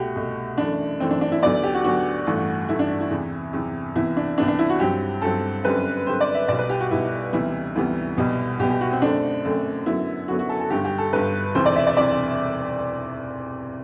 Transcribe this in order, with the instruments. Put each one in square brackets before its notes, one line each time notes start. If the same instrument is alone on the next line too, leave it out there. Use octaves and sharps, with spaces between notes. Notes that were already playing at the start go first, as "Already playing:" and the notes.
Already playing: [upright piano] C2 B2 A3 F#4 G4
C2 B2 A3
F#2 E3 A3 D4
F#2 E3 A3 C4
D4
D4
E4
D2 D3 F#3 B3 D5
G4
F#4
D2 D3 F#3 B3 F#4
A1 G2 E3 A3
A1 G2 E3 A3 E4
D4
E4
E2 C3 E3
E2 C3 E3
C2 C3 E3 B3 E4
D4
C2 C3 E3 B3 D4
D4
E4
F#4
G2 F#3 C4 G4
G2 F#3 C4 A4
F#2 D3 G3 C4 B4
F#2 D3 G3 C4 C5
D5
E5
B1 B2 G3 D5
B4
G4
F#4
B1 B2 G3 E4
D2 C3 E3 G3 B3 E4
D2 C3 E3 G3 B3
C2 B2 G3 B3
C2 B2 G3 B3 G4
G4
F#4
C4
F#2 D3 A3 C4 D4
F#2 D3 A3 C4
F#2 D3 F#3 B3 E4
F#2 D3 F#3 B3 F#4
F#4
A4
A4
G1 G2 D3 G4
G4
A4
G1 G2 D3 B4
E1 D2 C3 E3 C5
D5
E5
D5
C3 E3 D5